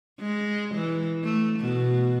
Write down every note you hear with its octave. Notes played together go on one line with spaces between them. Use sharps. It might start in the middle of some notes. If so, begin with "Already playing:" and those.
G#3
E3
A3
B2